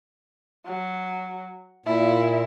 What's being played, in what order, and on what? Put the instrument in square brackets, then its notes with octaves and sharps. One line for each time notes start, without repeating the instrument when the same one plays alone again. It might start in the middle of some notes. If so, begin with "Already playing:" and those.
[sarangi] F#3
[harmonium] A#2 [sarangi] E4